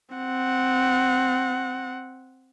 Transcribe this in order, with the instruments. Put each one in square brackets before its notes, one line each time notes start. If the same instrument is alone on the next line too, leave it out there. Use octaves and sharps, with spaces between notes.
[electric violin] C4 F#5